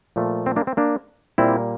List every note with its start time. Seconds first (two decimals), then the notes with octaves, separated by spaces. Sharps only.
0.16 A#2 F3 A3
0.46 C4
0.56 A#3 D4
0.67 C4
0.77 A#3 D4
1.38 A#2 G3 A#3 C4 E4